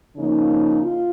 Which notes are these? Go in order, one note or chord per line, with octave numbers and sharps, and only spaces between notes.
C#3 F3 A#3 D#4
F4